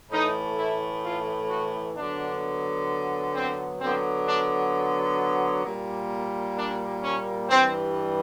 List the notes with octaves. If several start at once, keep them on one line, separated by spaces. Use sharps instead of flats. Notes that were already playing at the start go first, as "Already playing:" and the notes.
A2 E3 A3 D#4
E4
F4
F#4
D3 F#3 B3 D4
C4
D3 F#3 B3 C4
D4
A#2 G3 A#3
D4
C#4
G2 E3 G3 C4